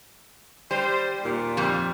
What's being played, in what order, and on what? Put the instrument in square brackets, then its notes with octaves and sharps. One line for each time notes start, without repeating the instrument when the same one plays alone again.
[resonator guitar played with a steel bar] G3 [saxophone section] C5
[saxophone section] D#2 A#2
[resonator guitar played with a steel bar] F2 G3